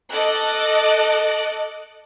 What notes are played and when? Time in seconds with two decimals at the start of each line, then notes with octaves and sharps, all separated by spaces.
0.11 A4 D#5 D6 F#6